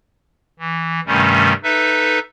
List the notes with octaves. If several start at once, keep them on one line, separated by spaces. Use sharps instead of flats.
E3
G2 C3 D#3 G3 A3 C#4
D#4 A4 B4 E5